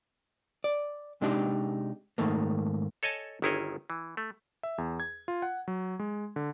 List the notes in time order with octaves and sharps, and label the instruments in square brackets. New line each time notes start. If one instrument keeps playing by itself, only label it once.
[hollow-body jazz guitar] D5
C3 G#3 D4 D#4 G4
G#2 B2 D#3 A3 A#3
[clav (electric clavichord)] A4 C#5 D#5 G#5 A5
G1 D#3 E4 G#4 C#5 D#5
E3
A3
[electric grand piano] E5
E2
G#6
F4
F#5
F#3
G#3
D3